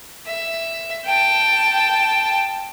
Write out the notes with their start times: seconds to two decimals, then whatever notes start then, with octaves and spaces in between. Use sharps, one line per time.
0.27 E5
1.06 G5 A5